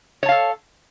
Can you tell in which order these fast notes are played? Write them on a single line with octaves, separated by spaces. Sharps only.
C#5 A5 F5 A4